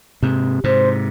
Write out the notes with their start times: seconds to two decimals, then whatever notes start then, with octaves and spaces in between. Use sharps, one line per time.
0.23 G#2 C3
0.64 G#2 C3 C5